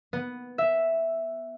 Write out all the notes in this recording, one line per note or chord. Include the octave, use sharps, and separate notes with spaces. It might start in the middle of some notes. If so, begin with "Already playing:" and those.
B3
E5